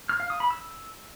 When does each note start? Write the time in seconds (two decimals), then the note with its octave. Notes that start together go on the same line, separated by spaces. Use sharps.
0.09 F6
0.20 F5
0.30 D#6
0.40 B5
0.51 E6